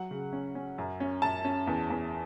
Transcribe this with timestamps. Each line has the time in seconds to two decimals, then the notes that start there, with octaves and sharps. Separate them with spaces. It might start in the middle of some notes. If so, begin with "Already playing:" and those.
Already playing: F#3 F#5
0.11 C#3
0.33 C#4
0.55 C#4
0.78 F#2
1.00 C#4
1.22 F#2 A5
1.44 C#4
1.67 E2
1.90 E2